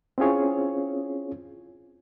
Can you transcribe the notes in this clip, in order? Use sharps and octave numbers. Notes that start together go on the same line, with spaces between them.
C4 C#4 E4 F4 G#4 C#5